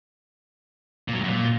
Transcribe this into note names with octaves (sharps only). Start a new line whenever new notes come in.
A#2
F#3
G2
F#2
A#2